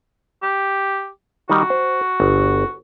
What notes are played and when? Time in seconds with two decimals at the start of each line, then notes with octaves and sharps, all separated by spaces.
0.43 G4
1.49 D#3 G3 F#4 D#5
1.70 C5
2.20 G1